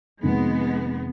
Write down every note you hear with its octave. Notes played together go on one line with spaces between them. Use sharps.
F1 F2 D#3 G#3 A#3 B3 D#4